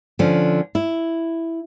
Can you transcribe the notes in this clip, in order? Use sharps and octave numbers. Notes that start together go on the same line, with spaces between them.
D3 F3 C#4
E4